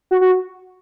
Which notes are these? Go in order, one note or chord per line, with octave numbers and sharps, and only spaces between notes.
F#4
F#4